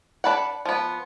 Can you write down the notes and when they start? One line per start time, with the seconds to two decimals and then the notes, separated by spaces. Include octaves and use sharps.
0.24 D4 B4 F#5
0.65 F3 B3